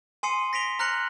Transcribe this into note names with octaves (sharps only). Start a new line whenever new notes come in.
G#5 C6 D#6 C7 C#7 D#7
A#6 B6 D7 F7 G7
A#5 F6 F#6 A#6 C#7 F#7